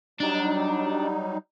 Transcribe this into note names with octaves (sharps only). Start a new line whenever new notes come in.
F#3 G3 D4 D#4